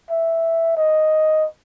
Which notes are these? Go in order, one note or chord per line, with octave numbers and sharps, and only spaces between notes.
E5
D#5